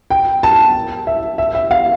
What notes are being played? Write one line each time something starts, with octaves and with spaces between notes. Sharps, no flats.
G5
A5
E5
E5
E5
F5